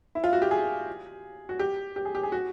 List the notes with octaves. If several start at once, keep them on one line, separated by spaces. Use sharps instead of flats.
E4
F4
F#4
G4
G#4
F#4
G4
G4
G#4
G4
G#4
F#4